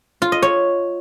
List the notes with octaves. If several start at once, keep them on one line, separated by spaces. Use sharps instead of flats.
F4
D#5
C#5